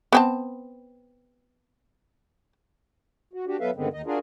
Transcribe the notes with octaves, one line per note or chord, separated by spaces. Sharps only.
B3 C4 A5
F#4
D4 F#4 G4
F#3 B3 A4 B4 E5 F5
G2 D3 D#3 G#3 B3 C4
D#2 D#3 D#4 D#5
D4 F4 F#4 G#4 A#4